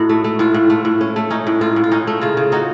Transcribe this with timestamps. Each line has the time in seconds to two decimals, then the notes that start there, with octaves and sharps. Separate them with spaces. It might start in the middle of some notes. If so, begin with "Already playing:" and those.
Already playing: A2 D#4 F#4
0.09 A3
0.24 A3
0.39 A2 F4
0.54 A2
0.70 A3
0.85 A2
1.01 C#4
1.16 A3
1.30 C#4 D#4
1.47 A2
1.61 A2 F4
1.76 A2
1.84 F4
1.92 C#4 D#4
2.07 A3
2.21 C#3 F4
2.37 C#3
2.52 C#4 D#4 F#4